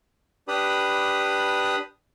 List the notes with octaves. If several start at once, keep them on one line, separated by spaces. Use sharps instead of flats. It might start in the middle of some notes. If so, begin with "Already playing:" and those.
D4 G4 B4 B5 D#6